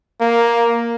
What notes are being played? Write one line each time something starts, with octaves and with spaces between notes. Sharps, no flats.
A#3